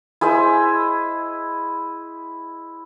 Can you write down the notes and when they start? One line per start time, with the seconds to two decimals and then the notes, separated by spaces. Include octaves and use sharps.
0.21 E4 G#4 C5 D#5